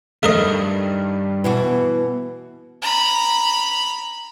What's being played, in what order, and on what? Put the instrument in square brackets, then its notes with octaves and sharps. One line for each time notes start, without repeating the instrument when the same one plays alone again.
[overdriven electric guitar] G2 [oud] D#3 [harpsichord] A3 A#4 D#5
[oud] B2 B3 F#4 [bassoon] E3
[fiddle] A#5 B5